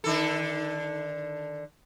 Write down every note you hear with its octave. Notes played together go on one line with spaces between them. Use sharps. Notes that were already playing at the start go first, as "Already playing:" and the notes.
D3 D#3 A4